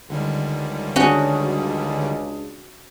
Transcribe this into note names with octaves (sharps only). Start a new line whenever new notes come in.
C#2 D3 D#3 G3
C#4 D4 F#4 G#4